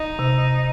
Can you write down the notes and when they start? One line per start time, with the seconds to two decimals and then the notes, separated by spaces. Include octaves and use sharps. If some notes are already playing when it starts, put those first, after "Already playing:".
Already playing: D#4
0.19 C3